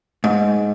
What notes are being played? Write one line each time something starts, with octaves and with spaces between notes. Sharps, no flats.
G#2